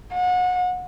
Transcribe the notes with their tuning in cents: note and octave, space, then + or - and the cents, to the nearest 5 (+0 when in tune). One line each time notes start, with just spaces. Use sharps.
F#5 -30